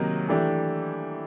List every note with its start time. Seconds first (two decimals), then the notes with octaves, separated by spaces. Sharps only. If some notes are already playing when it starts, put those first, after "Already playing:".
Already playing: C3 D#3 F#3 A#3
0.29 E3 A3 D4 G4